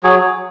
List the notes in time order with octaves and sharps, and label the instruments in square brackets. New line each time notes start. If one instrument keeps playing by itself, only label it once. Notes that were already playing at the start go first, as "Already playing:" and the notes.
[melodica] F#3 G#4 C#5